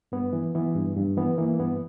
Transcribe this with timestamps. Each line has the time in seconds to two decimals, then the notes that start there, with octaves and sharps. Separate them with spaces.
0.12 G2 B3
0.33 E3
0.55 E3 B3
0.75 G2
0.97 G2
1.17 E3 B3
1.38 E3 A#3
1.60 G2 B3